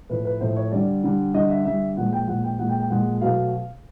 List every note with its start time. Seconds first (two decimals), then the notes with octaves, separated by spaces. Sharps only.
0.09 A2 F3 A3 B4
0.25 B4
0.41 A2 F3 A3 C5
0.56 C#5
0.71 D3 G3 D5
1.04 D3 G3
1.34 D3 G3 D#5
1.50 E5
1.65 D3 G3 E5
1.97 A#2 F3 G#3 F#5
2.13 G5
2.28 A#2 F3 G#3 F#5
2.44 G5
2.59 A#2 F3 G#3 F#5
2.69 G5
2.80 G5
2.90 A#2 F3 G#3 F#5
3.21 B2 F#3 A3 F5